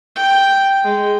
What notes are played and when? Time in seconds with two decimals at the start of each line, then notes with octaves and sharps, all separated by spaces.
0.16 G5
0.84 G#3